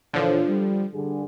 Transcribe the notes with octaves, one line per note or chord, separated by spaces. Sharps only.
A#2 D3 E3 F3 C#5
G3
G2 D3 G#4